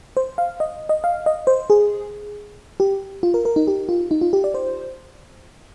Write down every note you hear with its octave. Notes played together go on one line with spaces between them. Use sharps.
C5
F5
D#5
D#5
F5
D#5
C5
G#4
G4
F4
A#4
A#4
D#4
G4
F4
D#4
F4
G4
D5
C5